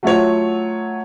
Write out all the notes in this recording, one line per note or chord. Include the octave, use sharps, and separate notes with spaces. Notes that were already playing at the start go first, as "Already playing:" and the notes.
F#3 A3 F4 C#5